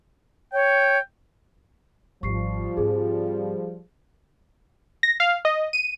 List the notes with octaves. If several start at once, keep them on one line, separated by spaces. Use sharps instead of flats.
C#5 G5
G#1 D#2 F3 G3 C#6 C7
G#2 C4 G#4
A#6
F5
D#5
D#7